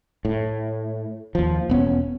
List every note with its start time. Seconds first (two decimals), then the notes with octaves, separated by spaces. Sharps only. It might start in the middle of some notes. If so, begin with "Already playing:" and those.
0.25 A2
1.35 D#2 F3
1.70 E1 B3 C#4